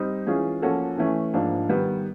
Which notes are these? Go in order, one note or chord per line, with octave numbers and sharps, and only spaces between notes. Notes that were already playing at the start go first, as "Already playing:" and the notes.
Already playing: G3 C4 D#4
E3 G#3 C#4 F4 G#4
F3 A#3 C#4 F#4 A4
E3 A3 C#4
G#2 F3 A#3 D4
D#3 G3 B3